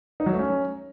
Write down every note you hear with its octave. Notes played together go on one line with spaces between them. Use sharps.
D#4
F#3
A3
C#4